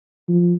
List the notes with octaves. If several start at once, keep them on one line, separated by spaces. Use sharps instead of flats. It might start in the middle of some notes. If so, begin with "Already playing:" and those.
F3